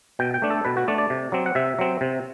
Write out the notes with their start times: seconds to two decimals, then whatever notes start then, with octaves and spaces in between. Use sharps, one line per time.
0.19 B2 G5
0.34 G5
0.42 A3 D4
0.50 A4
0.65 B2 B4
0.77 F#4
0.88 A3 D4 D5
0.98 D5
1.10 C3
1.32 F#3 C4
1.46 F#5
1.55 C3 E5
1.79 F#3 C4
2.01 C3